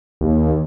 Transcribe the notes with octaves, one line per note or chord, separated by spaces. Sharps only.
D#2